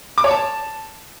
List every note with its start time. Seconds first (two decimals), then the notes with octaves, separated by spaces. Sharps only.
0.18 D6
0.24 C#5
0.31 A5